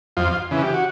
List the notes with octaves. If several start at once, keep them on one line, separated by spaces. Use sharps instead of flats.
F2 F4
C#3 E3
G4
F#4